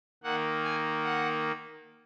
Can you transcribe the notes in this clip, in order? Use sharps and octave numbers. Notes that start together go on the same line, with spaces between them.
D#3 A#3 F#5
G#5
F#5